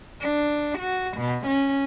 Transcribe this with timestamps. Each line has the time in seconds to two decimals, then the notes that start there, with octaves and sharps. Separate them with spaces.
0.21 D4
0.79 F#4
1.17 B2
1.46 C#4